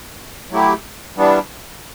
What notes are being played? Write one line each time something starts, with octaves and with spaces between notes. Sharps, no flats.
F#3 A3 E4 G4
E3 G3 B3 D4